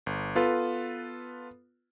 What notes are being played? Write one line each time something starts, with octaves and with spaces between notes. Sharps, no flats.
G1
B3 F4 A4 B4